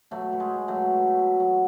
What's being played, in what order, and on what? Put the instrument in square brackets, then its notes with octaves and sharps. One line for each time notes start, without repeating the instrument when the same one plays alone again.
[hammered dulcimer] B2 F#3 A3
B2
G#3
B2
F#3 A3
B2
B2
B2
F#3